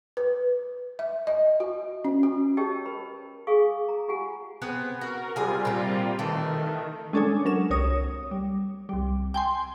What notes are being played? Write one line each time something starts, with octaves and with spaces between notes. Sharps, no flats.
B4
E5
D#5
F#4
C#4
F#4
G4 C#5 D#5 G5 A5 E6
A#4 B4 B5
G#4 F5 G#5 C#6 D#6
A#5
F4 G4 F#5 G#5
B3 C4 G#4
F#4 A#4
C3 G3 F4 G#4 G#5
A#2 C4
D#3 E3 A3
G#3 C#4 D4 A4 C#5 G#5
F#3 A#4 E7
C2 C#5 D#6 A#6
G3
C2 G3
G5 G#5 C6